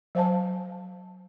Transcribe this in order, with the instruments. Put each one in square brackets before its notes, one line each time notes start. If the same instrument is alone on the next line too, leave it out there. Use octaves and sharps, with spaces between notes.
[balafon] F#3 C5 F5 G#5 A5